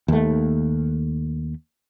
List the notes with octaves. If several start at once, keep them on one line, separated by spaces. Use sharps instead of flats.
D#2 A3